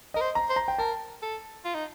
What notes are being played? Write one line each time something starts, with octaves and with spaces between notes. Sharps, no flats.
A#4 D#5
C5
A#5
C5
A#5
G5
A#4 A5
A4
F4
D#4